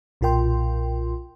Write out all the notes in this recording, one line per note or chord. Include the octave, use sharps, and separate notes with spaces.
B1 A#2 F4 A#4 G5 C6